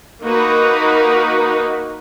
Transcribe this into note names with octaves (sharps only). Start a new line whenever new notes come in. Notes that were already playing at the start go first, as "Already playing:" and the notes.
A#3 D#4 F#4 A#4 B4